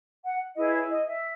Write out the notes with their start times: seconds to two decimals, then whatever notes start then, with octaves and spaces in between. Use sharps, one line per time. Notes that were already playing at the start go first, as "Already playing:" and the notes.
0.23 F#5
0.55 E4 G#4 B4 D#5
0.73 C#5
0.88 D#5
1.06 E5